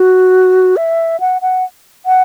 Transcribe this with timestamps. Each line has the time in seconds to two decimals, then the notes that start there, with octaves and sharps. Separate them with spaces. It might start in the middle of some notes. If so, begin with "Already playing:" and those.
Already playing: F#4
0.77 E5
1.20 F#5
1.42 F#5
2.06 F#5